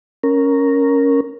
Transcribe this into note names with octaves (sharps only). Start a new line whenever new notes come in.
C#4 A#4